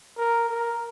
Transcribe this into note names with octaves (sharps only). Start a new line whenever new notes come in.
A#4
A#4